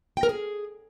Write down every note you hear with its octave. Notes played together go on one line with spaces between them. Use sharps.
G5
A#4
G#4